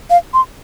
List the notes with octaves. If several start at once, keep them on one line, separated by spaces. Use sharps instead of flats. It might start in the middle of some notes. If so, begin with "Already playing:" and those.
F5
C6